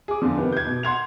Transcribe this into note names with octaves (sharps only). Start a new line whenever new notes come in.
G#4 D6
E2 D3 F3
C3 D#3 B3
G6 G#6
B2
F#5 C6 G#6 F7